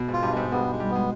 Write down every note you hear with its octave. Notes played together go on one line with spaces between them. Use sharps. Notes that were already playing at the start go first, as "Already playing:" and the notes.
Already playing: B2
G#2 F4
G2
G#2 G#3
G2 B3
G#3
G3
B3
G#3